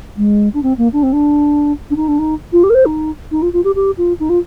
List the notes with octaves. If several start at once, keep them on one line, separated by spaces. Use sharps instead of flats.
G#3
D4
C4
A#3
D4
C4
D4
D4
D#4
D4
D#4
F4
G4
A#4
C5
D#4
D#4
F4
F4
G4
G4
F4
D#4
F4